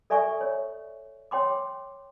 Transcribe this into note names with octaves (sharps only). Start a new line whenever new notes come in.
A4 D5 E5 G#5 C#6
C#5
C#5 G5 C6 D6